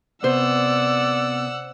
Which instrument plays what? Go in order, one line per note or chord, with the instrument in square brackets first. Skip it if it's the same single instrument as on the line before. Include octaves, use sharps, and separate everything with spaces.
[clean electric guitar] C3 B3 [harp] C5 [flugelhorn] D5 [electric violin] F#5 E6